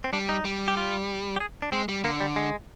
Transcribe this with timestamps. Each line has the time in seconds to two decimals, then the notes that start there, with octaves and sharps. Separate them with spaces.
0.04 C4
0.13 G3 D4
0.29 D#4
0.45 G3
0.68 G4
0.77 F4
1.36 G4
1.40 G#4
1.62 D4
1.72 G#3 C4
1.89 G3
2.04 D3 A#3
2.20 G3
2.36 G#3